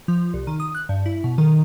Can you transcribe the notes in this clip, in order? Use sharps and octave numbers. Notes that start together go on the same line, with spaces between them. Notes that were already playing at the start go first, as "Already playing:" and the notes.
F3
C2
D#3
D#6
F#6
G2
E4
B2
D#3